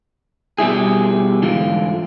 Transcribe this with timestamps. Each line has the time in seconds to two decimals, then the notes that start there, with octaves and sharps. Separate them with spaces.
0.58 B2 G3 E4 G#4
1.43 G#2 D3 E3 F4